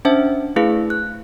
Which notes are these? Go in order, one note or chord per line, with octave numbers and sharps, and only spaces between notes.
C#4 D4 C5 E5 A5
A3 E4 G#4 B4 F5
F#6